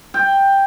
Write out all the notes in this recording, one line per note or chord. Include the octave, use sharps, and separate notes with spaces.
G5